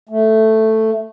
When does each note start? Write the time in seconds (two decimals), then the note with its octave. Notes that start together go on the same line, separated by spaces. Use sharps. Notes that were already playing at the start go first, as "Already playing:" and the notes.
0.09 A3